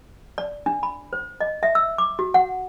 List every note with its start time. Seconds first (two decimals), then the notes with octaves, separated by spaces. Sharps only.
0.38 D5
0.66 D4
0.83 B5
1.13 C5
1.41 D#5
1.63 E5
1.75 E6
1.98 D6
2.19 F#4
2.34 F#5